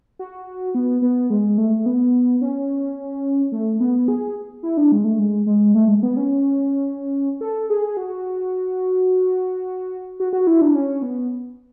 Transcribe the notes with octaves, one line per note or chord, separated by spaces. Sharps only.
F#4
B3
B3
G#3
A3
B3
C#4
A3
B3
G#4
E4
D4
G#3
A3
G#3
G#3
A3
G#3
B3
C#4
A4
G#4
F#4
F#4
F#4
E4
D4
C#4
B3